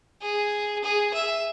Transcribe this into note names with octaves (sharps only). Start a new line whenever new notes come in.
G#4
G#4
E5